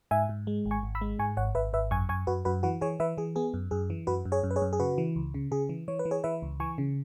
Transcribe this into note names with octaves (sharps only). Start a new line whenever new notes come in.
G#2 E5 G#5
G#2
G#3
G#1
G#5 C#6
G#1
B5 E6
G#3
G#2 G#5 C#6
G#1 C#5 F#5
G#1 B4 E5
G#1 B4 E5
F#2 G#5 C#6
F#2 G#5 C#6
F#2 F#4 B4
F#2 F#4 B4
E3 F#4 B4
E3 G#4 C#5
E3 B4 E5
E3 G#4
B3 G#4
F#2
F#2 G#4
E3
F#2 F#4 B4
F#2
G#4 C#5
F#2
B4
G#4 C#5
F#2
G#4
C#3 F#4 B4
E3
C#2
C#3
C#3 G#4
E3
E3 C#5
B4
E3
G#4 C#5
E3 B4 E5
C#2
E3 G#5 C#6
C#3